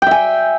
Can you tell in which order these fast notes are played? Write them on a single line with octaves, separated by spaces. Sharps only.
G5 E5 G#5